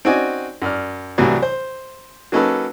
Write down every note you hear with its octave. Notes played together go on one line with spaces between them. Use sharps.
C4 C#4 D#4 F#4 D5 G#5
F#2 D5 F6
C2 A2 C3 E3 F#3 G3
C5
F#3 A#3 C#4 D#4 A4 B4